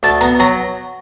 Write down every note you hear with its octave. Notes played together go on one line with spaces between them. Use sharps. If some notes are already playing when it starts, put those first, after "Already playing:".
D2 A5
B3 A#5
F#3 A#5